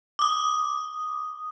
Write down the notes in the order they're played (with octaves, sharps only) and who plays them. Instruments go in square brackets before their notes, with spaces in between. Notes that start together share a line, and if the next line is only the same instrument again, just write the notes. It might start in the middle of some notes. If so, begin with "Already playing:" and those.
[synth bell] D6 D#6